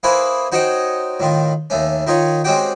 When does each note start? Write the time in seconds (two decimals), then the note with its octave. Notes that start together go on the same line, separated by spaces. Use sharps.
0.03 A#3 E4 G#4 B4 C5
0.52 D#4 F#4 C5 C#5 D#5 G5
1.20 A2 D#3 F4
1.70 D#2 A3 C#4
2.07 D#3 D#4 F4 C#5
2.44 G#3 C4 C#4 F#4 G4 G5